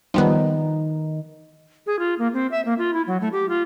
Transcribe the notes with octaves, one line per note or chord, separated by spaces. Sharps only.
D#3 F3 G3 B3 D#4
G#4
F4
A#3
C4
E5
A#3
F4
E4
F#3
A3
G4
F4